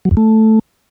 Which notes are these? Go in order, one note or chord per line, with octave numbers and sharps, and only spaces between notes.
F#3
F2
A3